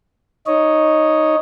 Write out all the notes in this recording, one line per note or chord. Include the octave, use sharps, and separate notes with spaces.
D#4 C#5 D#5